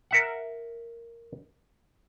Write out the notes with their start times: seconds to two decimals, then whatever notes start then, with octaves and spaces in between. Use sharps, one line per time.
0.11 A#4 E5 F#5